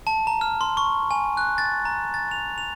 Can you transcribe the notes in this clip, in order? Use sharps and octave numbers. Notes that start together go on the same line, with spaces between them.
A5
A#5
F6
C6
C#6
G#5
F#6
A6
A#5
A6
F7
F7